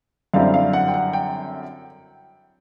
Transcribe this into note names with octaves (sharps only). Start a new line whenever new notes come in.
F#2 D3 G3 C4 E4 F5
F5
F#5
G5
F#5
G5